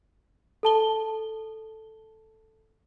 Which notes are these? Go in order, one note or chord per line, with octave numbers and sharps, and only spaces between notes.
A4 A5 G7